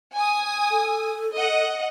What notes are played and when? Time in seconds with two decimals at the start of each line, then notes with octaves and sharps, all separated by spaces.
0.14 G#5 D#6
0.71 A4
1.35 D#5 F#5